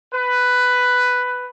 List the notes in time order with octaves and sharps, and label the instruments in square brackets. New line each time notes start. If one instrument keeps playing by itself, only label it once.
[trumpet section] B4